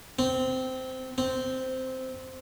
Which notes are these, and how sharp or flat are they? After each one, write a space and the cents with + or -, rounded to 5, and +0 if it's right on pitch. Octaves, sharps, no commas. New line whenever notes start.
C4 -15
C4 -10